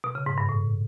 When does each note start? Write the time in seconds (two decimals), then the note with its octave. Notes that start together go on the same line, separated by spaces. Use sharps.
0.04 B2
0.15 C#3
0.26 G#2
0.38 G2
0.49 A2